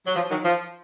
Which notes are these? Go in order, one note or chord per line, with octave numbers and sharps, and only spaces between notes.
F#3
F3
D#3 F#3
F3